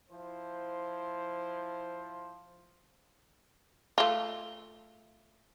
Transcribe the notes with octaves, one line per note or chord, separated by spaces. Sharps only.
F3 E4 C5
A3 F4